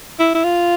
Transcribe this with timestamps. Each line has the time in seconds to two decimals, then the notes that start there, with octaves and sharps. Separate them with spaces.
0.19 E4
0.35 E4
0.44 F4